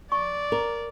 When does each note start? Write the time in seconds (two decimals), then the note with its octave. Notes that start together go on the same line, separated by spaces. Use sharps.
0.12 D5 C#6
0.52 A#4